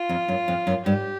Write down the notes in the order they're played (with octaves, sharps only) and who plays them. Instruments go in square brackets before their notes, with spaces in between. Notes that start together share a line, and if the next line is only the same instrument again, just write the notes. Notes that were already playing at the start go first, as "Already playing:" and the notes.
Already playing: [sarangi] F4
[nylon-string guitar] F2
F#2
F2
F#2
[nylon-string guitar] G2 [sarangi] G4